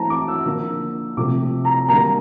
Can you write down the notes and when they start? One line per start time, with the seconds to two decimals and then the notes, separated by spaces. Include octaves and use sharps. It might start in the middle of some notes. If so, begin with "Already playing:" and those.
Already playing: E3 A3 C4 A5 A#5
0.10 D6
0.28 E6
0.46 D3 F3 A#3
1.17 C3 F3 A3 D6
1.65 A#5
1.89 D3 G3 A#3 A#5